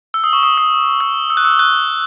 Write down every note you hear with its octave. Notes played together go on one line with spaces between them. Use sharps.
E6
D#6
C#6
D#6
D#6
E6
E6
F#6
E6
F#6